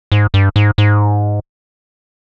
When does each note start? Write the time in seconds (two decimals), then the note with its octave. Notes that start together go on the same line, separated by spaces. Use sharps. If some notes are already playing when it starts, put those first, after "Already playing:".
0.12 G#2
0.34 G2
0.56 G#2
0.78 G#2